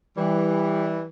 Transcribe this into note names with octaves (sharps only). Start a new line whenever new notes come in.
E3 G3